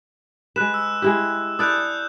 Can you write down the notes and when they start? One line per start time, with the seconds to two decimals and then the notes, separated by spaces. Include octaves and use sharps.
0.56 G#3 B4 F#6 E7
0.74 E6
1.02 G#3 E4 G4
1.59 E4 A4 D5 D#6 F#6 G6